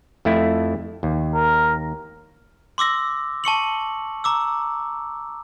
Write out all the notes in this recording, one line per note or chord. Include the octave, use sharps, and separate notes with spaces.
F2 A3 E4
D#2
A#4
C6 D6 E6 A#6
A5 C#6 C#7 F#7
A#5 D6 E6